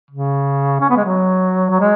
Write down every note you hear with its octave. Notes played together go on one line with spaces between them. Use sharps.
C#3
C#4
B3
G#3
F#3
F#3
G#3